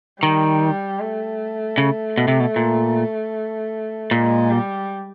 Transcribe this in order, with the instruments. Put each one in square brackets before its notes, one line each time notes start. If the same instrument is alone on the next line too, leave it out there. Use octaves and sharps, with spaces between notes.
[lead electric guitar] D#3 [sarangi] G3
[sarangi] A3
[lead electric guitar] C#3
B2
C3
B2
A#2
[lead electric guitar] A#2 [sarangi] G#3
[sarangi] G3